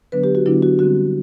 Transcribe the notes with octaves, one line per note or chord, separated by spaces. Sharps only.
D3 F#3 B3 D4 B4
G4
F#4
D3 F#3 B3 D4 E4
F#4
D3 G3 C4 F#4